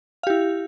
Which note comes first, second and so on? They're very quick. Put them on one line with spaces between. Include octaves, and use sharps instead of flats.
F5 G4 E4